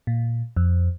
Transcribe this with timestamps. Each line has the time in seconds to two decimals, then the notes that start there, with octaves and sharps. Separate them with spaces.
0.07 A#2
0.57 F2